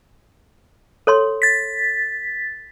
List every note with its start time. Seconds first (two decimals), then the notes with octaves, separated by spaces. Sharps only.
1.07 A4 C#5 C6
1.42 A6 B6